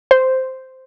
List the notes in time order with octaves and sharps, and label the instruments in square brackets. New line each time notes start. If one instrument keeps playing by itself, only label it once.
[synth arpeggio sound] C5